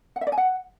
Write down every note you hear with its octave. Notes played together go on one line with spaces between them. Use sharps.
F#5
E5
D5
G#5
F#5